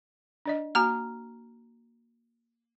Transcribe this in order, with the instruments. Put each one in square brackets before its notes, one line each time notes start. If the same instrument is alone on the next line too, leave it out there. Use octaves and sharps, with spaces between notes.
[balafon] D4 D5 D#5
[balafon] A#3 F#4 G#5 [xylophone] A#5 F6